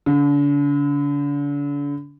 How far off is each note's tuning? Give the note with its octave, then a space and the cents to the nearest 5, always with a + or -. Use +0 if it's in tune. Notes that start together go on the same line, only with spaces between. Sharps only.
D3 -40